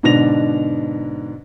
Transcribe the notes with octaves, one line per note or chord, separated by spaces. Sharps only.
G#2 B2 D3 D4 A#6 F7